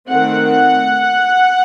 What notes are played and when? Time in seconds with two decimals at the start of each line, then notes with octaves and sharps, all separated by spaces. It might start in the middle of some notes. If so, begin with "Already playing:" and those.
0.10 D#3 A3 C4 F#5